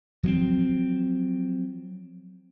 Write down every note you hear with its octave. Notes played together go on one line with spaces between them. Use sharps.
F3 F#3 A#3 C4